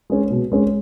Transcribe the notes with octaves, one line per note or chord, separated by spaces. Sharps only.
G#3 C#4
B2
G#3 C#4